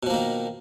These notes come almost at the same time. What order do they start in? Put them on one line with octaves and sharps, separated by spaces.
B2 F3 A#3 D#3